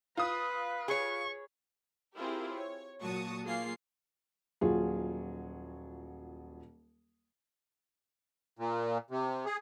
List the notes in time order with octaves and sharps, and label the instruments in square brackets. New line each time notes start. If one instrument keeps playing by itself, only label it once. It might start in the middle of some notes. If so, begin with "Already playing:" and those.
[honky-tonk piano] F4 D#6 [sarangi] B4
[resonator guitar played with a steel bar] G#4 C#5 [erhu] C#6
[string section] C4 E4 F4 G4 G#4 A#4
C#5
A#2 F#3 F#4 A5 C#6 D#6
F#3 A#3 F4 G#4 F5 C7
[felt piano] D#1 F#3 F4 G#4
[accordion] A#2
C3
G#4